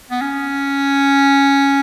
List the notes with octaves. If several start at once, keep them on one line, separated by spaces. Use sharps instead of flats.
B3
C#4